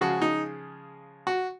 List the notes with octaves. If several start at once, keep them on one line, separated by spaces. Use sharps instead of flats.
C#3 F3 G#3 F#4
D#4
F#4